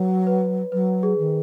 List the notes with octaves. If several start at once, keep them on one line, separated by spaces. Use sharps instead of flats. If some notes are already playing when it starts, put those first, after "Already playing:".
Already playing: F#3 B4 C#5
B4
F#3 B4
G#4
D#3